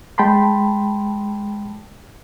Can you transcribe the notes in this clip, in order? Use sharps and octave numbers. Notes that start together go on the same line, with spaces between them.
G#3 G5 A5 B5 C6